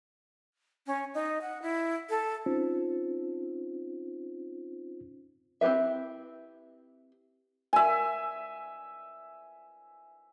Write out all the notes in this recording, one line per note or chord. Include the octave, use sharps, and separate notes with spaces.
C#4
D#4
F#5
E4
A4
C4 C#4 D#4 F4 C5
C4 E4 G4 B4 E5
E5 G#5